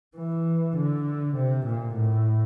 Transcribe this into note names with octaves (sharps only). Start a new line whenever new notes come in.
E3
D3
C3
A#2
A2